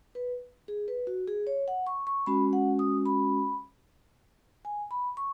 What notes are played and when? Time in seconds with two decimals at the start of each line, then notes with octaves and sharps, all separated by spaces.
0.15 B4
0.68 G#4
0.88 B4
1.07 F#4
1.27 G#4
1.47 C#5
1.68 F#5
1.87 C#6
2.07 C#6
2.26 G#3 C#4 F#4 B5
2.53 F#5
2.79 D#6
3.06 B5
4.65 G#5
4.91 B5
5.17 C#6